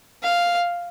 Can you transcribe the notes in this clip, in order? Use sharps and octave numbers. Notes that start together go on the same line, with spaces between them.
F5